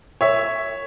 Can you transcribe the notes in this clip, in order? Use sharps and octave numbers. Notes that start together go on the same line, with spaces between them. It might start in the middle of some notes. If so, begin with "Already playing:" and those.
C#5 E5